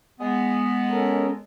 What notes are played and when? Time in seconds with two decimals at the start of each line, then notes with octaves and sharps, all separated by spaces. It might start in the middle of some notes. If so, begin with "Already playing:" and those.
0.20 G#3 B3
0.91 C#4 A4 A#4